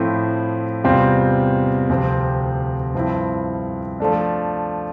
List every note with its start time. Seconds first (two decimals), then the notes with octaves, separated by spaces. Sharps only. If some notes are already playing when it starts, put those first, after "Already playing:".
Already playing: A2 F3 C4 E4
0.84 E2 C3 G3 C4 F4
1.89 D2 C3 F3 C4 G4
2.94 G2 F3 C4 E4
4.00 F3 A3 D4